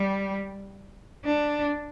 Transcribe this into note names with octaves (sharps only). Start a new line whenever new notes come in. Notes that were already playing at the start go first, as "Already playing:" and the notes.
Already playing: G3
D4